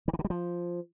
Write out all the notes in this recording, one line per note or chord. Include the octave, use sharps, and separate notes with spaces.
D#3
E3
D3
G3
F3